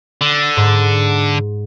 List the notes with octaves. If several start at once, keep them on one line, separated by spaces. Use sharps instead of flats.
D3
G#2